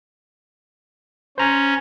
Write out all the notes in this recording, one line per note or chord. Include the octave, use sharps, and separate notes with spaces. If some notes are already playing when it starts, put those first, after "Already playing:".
C#4 C5 A#5